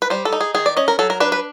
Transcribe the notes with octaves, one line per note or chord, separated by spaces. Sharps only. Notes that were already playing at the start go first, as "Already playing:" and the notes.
B4
G3 C5
A4
D#4
G#4
D#3 G#4
D5
C#4 D#5
A#4
F#3 A4
A#4
D4 B4
B4